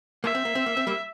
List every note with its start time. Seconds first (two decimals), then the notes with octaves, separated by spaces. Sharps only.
0.24 A#3 E5
0.35 C4
0.45 A#3
0.55 C4
0.66 A#3
0.77 C4
0.87 G3 A#3